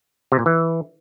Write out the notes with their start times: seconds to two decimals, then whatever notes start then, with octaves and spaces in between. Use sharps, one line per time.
0.32 C3
0.39 A#2
0.46 E3